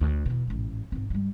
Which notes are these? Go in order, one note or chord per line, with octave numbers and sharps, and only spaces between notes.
D2
E2 B2
A1 G#2
G#2 C4
G2 G3